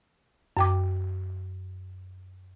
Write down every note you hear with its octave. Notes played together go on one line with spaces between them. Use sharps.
F#2 G5 D6